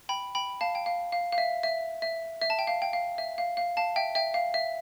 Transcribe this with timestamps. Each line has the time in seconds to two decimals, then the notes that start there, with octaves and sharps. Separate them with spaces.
0.09 G5 B5
0.35 G5 B5
0.61 F5 A5
0.75 G5
0.86 F5
1.12 F5
1.32 F5
1.38 E5
1.63 E5
2.02 E5
2.42 E5
2.50 A5
2.59 G5
2.67 F5
2.82 G5
2.93 F5
3.18 E5
3.38 F5
3.57 F5
3.77 F5 A5
3.96 E5 G5
4.15 E5 G5
4.34 F5
4.54 E5